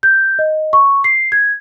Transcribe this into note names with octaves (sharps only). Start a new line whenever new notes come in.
G6
D#5
C#6
C7
G#6